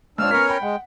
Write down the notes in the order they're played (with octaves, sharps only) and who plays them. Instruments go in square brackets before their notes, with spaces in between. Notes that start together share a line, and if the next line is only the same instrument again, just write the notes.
[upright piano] G#2 F4 C#5 [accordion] C4 D4 E6 [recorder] F6
[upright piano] B3 B6 [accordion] C#4 A#4 C#5
[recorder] G5 [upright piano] B5
[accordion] G#3 [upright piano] F#5